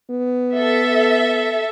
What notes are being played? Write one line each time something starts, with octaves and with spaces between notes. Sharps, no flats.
B3
A4 E5